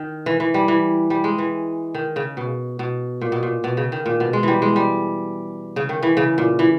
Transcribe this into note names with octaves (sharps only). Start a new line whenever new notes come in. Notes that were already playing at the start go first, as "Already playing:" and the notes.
Already playing: D#3
E3
E3
G3
E3
G3
G#3
E3
D#3
C#3
B2
B2
A#2
B2
A#2
B2
C#3
D#3
A#2
B2
G#3
E3 G3
G#3
G3
C#3
D#3
E3
C#3
A#2
E3